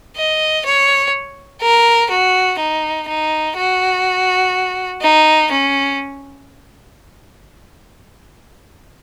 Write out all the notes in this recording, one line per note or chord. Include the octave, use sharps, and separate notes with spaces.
D#5
C#5
A#4
F#4
D#4
D#4
F#4
D#4
C#4